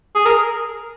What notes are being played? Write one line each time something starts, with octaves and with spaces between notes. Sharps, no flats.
G#4
A#4